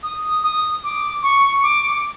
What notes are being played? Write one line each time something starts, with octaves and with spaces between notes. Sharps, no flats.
D#6
D#6
D6
C#6
D6